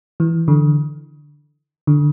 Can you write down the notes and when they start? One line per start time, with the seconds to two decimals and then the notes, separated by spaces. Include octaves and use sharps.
0.20 E3
0.48 D3
1.87 D3